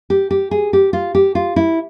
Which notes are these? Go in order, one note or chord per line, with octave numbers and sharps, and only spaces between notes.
G4
G4
G#4
G4
F4
G4
F4
E4